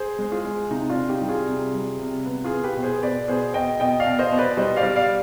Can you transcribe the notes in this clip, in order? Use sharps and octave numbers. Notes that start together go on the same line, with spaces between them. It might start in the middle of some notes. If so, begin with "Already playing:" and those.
Already playing: G#4 C5
G#3
F4 G#4
G#3
C3 D#4
D4 F4
C3
D#4 G4
G3
F4 G#4
C3
G3
C3
B3
F4 G#4
B3
G4 B4
B2
G#4 C5
B2 B4 D5
B2 G#4 C5
B2 D#5 G5
B2 D#5 G5
D5 F5
B2
C5 D#5
B2
B4 D5
G3 C5 D#5
D5 F5
G3
D5 F5